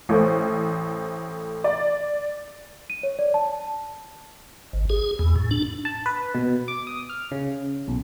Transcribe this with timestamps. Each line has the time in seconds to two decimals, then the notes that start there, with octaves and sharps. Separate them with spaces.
0.09 A1 A3 C5
1.64 D5
2.90 D#7
3.03 C#5
3.19 D5
3.34 A5
4.73 G#1
4.90 G#4
5.19 E2
5.36 A2
5.51 D4
5.85 A5
6.06 B4
6.35 B2
6.68 D6
6.87 D#6
7.09 F6
7.31 C#3
7.88 B1